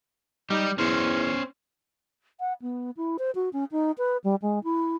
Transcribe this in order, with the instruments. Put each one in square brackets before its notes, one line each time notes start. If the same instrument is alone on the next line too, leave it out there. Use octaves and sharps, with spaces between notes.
[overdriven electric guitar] G3 G4 [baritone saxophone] D#4
[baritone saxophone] E2 [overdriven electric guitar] C#4 C5
[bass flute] F#5
B3
E4
C5
F#4
C#4
D#4
B4
G3
G#3
E4